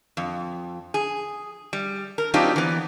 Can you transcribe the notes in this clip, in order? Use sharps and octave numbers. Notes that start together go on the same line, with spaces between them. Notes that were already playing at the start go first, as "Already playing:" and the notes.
F2
G#4
G3
A#4
F#3 C4 D4 D#4 F4 G4
E3 B3